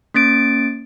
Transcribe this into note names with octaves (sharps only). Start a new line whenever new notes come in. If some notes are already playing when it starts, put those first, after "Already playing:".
A#3 C#4 A6 D7